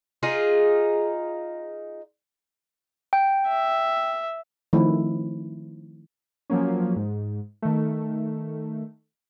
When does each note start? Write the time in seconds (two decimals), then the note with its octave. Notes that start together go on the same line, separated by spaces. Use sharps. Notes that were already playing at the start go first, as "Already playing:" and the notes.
0.23 D#4 F4 G#4
3.13 G5
3.48 E5
4.73 D#3 F3 A3 C4 E4
6.50 F3 F#3 A#3 C#4
6.96 G#2
7.62 D#3 A3